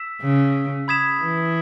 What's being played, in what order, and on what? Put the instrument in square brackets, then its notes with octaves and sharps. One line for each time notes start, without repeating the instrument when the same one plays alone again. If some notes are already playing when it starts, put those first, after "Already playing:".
Already playing: [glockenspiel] E6 B6 E7
[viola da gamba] C#3
[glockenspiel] B5 D#6 G#6 B6 E7
[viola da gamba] E3